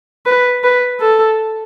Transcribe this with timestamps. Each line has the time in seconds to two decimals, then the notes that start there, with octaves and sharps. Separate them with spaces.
0.26 B4
0.64 B4
1.01 A4